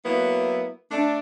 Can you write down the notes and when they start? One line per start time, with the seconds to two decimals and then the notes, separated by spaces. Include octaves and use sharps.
0.04 F#3 A#3 B3 E4
0.91 A3 D4